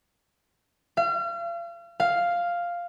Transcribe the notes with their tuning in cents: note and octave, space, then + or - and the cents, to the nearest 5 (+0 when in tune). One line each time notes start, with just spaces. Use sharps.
F5 -40
F5 +0